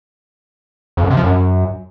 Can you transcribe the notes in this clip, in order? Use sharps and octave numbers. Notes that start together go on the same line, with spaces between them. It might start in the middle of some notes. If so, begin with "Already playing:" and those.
F2
F#2
C3
F3
F#2